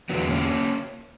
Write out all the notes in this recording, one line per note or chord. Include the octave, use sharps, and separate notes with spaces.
E2 D3 F#3 B3
A#3 C#4